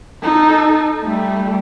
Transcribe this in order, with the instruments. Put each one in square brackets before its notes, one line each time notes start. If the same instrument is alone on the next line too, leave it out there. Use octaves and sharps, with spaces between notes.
[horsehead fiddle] D#4 A4
G3 A3